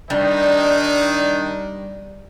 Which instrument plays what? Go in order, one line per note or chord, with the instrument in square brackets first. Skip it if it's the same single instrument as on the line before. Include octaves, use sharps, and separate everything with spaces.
[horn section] D#3 D4 D#4 [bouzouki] G3